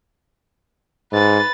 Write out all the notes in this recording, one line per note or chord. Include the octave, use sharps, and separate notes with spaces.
G#2 B4 A6